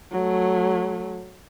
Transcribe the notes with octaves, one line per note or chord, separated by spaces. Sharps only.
F#3 A3